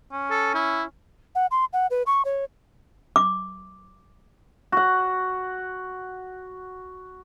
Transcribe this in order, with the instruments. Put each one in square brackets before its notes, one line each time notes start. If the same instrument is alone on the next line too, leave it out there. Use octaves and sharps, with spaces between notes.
[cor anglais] C#4
[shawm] A4
E4
[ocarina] F#5
C6
F#5
B4
C#6
C#5
[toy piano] D6
[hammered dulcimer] F#4 F#5